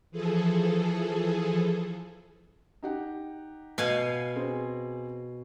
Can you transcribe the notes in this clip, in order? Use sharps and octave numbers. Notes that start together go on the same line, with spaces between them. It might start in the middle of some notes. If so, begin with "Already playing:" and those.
E3 F3 G#4 A4
D#4 G4 F#5
B2 F5 G#5
C4 G#4